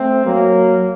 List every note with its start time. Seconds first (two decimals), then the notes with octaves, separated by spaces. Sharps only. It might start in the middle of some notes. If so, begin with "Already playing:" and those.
Already playing: A3 C4
0.25 F#3 A#3